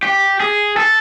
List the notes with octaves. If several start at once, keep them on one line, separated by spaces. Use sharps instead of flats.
G4
G#4
A4